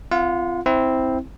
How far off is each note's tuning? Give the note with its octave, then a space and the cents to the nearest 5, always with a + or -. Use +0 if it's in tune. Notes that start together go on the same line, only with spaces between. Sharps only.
C4 -20 F4 -20 F#5 -45
C4 +0 E4 -15